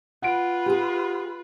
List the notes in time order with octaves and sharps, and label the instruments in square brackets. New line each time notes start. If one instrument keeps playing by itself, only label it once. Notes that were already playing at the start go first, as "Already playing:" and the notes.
[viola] F4 B4 [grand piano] F#5 D7
[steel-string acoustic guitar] G4 G#4